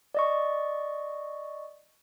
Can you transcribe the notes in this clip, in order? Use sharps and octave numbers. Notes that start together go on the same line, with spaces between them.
D5 D#5 C#6